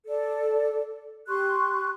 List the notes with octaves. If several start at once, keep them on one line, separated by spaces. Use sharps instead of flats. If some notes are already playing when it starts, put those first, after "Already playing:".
A4 D5
G4 C6 C#6 F#6